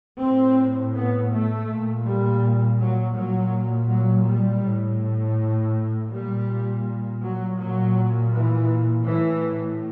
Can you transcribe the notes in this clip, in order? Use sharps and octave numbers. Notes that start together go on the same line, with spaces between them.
A2 C4
B3
A3
A#2
G3
F#3
A#2 F#3
F#3
G3
A2
A#2 G3
F#3
A#2 F#3
E3
A2 E3